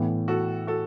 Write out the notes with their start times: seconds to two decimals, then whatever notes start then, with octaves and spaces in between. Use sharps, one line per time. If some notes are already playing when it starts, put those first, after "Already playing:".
Already playing: A2 E3 B3
0.28 F#4 A4
0.67 F#4 A4